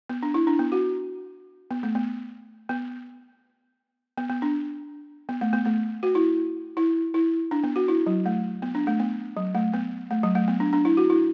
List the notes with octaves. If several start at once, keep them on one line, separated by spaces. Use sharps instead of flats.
B3
D4
E4
D4
B3
F#4
B3
A3
B3
B3
B3
B3
D4
B3
A3
B3
A3
F#4
E4
E4
E4
D4
B3
F#4
E4
F#3
A3
B3
D4
A3
B3
F#3
A3
B3
A3
F#3
A3
B3
D4
D4
E4
F#4
E4